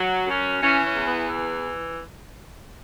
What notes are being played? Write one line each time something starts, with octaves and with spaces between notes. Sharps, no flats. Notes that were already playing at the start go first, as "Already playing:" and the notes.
Already playing: F#3
F#2 C#4
E3 C#4
C#4
E2
B3
E3